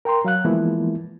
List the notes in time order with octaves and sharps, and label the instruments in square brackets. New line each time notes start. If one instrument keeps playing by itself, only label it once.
[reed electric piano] A#4 G5 A#5 C6
F#3 F5 F#6
E3 F3 G#3 A#3 B3 E4